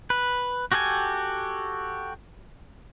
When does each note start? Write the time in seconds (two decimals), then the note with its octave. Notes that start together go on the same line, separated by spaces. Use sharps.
0.10 B4
0.72 F#4 G4 A4 C5 G#5